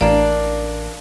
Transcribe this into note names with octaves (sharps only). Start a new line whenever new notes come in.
A1 A#3 D4 D5